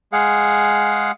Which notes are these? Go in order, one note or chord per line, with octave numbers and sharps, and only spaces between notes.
G#3 G#4 F5 F#5